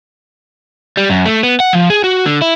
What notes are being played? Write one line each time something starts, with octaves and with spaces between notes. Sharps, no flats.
G3
F#2
A3
B3
F#5
F3
G#4
F#4
D3
E4